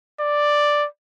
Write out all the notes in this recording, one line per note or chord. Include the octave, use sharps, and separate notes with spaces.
D5